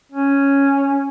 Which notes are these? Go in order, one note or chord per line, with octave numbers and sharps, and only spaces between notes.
C#4